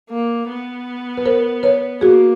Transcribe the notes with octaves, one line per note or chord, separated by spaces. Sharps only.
A#3
B3
B4
A#4 C5
B4 C#5
A#3 F#4 G#4